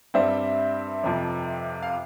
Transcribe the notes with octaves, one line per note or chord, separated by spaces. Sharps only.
G2 G3 C4 C5 E5
F2 C3 F3
F5